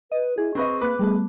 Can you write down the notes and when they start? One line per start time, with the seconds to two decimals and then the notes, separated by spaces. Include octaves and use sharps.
0.12 B4 D#5
0.38 E4 G#4
0.55 C4 B4 D#5 C#6
0.81 A#3 B4 D6 F#6
0.99 G3 A3 B3 G#4